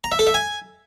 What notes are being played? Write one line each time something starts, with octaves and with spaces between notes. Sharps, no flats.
A#5
E5
A4
E5
G#5